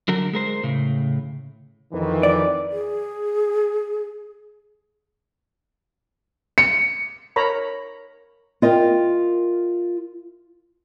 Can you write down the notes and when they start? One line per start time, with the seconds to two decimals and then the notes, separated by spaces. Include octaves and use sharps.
0.08 D3 F#3 A#4
0.33 G#3 A#4 C5
0.63 A2 C#3
1.93 F2 D#3 E3
2.23 D5
2.72 G#4
6.58 C#7
7.36 A#4 C#5 A#5 B5
8.62 F4 A#4 D#5 E5 G5